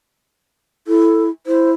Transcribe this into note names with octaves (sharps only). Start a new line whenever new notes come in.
E4 A4
E4 C5